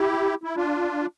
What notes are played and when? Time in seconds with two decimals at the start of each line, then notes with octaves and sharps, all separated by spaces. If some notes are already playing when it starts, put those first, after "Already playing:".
Already playing: E4 G4
0.44 E4
0.56 D4 F4